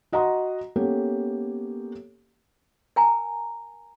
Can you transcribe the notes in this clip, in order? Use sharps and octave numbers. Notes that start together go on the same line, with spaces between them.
F#4 D#5 F#5 A#5 C6 D#6
A#3 B3 C#4 G4 A4
A#4 G#5 A#5